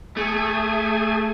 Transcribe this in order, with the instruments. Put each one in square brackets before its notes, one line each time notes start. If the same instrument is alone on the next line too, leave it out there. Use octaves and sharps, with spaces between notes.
[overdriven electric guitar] A3 [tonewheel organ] G#4 G#5